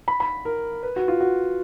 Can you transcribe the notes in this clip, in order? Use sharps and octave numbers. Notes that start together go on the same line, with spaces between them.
B5
B5
A#4
B4
F#4
F4
F#4